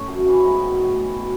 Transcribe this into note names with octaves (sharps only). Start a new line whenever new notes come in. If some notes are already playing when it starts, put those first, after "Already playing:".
Already playing: A3 C#4
F#2
C#3 E3
G#2 B3 D#4
D#3 F#3
A2
E3
B2